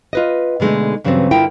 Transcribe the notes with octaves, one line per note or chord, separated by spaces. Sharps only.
F4 B4 D#5
B2 D3 G#3 A3 D#4
G2 C#3 E3 F#3 B3 C4
G2 D3 E4 F4 A#4 G5